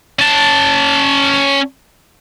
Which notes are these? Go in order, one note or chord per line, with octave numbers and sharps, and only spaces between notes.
C#4 A5